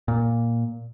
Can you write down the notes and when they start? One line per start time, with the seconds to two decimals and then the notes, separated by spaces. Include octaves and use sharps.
0.08 A#2